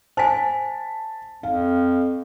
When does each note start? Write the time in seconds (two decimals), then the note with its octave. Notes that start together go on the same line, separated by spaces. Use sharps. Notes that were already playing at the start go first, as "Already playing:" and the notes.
0.17 C5 G#5 A5 B6
1.43 F2 F5